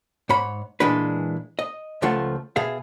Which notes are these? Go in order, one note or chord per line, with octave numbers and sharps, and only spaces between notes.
G#2 C#5 B5
A#2 E3 G#3 D4 B4
D#5
C#2 F3 A3 F4 F#5
B2 G#4 E5 F5